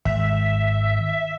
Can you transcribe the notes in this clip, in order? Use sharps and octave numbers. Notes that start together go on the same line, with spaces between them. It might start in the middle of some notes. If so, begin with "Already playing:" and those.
G#1 E5